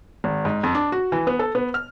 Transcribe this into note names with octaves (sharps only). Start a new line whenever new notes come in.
G#1
G#2
F2
D4
F#4
E3
B3
A4
B3
F6